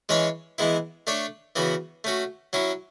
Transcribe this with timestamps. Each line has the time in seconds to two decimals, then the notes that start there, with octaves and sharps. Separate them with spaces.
0.09 E3 G#3 C#4 G#4 C#5
0.58 E3 G#3 B3 E4
1.07 A3 D4 A4 C#5
1.56 C#3 E3 B3 F#4
2.04 A3 C#4 F#4
2.53 F#3 C#4 E4